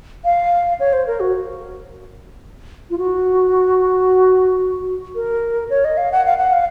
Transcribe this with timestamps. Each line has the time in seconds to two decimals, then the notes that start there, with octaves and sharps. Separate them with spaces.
0.24 F5
0.80 C#5
0.93 C5
1.07 A#4
1.20 F#4
2.90 F4
2.98 F#4
5.15 A#4
5.70 C#5
5.85 D#5
5.97 F5
6.12 F#5
6.26 F5
6.38 F#5
6.53 F5